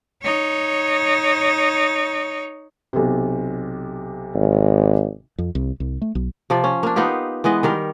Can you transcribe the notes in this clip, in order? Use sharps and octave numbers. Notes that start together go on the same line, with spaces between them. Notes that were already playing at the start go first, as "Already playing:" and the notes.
D#4 C#5
B1 C3
G#1
F2
C2
C2
A3
B1
C3 F3 D5
C#4
A#3 D4
B3 D#4 F4 G4
E3 G#3 B3 D#5
D#3 G3 A#4